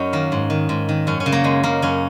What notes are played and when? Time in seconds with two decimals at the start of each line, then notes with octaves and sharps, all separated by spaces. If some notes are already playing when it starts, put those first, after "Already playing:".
Already playing: F#2 C#4 D#4 F#4
0.13 D#3 A#3
0.32 G#2
0.50 D#3
0.69 G#2
0.89 D#3
1.07 F#2 C#4
1.20 C#4
1.26 C#3
1.32 A#3
1.44 F#2 G#3
1.63 C#3 A#3
1.82 F#2 C#4